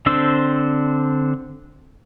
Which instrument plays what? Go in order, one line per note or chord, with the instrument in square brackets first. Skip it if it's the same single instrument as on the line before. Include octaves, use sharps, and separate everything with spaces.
[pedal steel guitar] D3 C4 D4 C5 E6